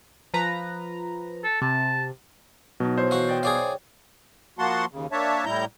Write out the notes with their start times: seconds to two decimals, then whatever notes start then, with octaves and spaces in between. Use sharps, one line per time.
0.34 F3 B4 A#5
1.43 A4
1.62 C3 A5
2.80 B2 F#3 D#4
2.97 E4 C5 C#5
3.11 E3 F#4 F5
3.28 D5 D#5 G5
3.43 G#4 C#5 D5 F5
4.59 F3 A#3 F#4 F#5 A5 C6
4.92 D#2 C#3
5.12 A#3 D4 C#5 E5 A5
5.45 A2 G3 E4 A#5 G6